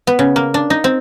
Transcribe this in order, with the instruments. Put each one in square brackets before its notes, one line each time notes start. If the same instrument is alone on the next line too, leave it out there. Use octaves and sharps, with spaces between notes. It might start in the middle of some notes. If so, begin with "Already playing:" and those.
[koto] B3
C#3
A#3
D4
D#4
C4